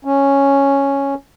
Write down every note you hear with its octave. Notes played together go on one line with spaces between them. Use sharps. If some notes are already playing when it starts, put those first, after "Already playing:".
C#4